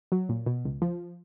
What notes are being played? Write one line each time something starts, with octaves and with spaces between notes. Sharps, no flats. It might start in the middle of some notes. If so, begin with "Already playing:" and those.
F#3
A#2
B2
C#2
F3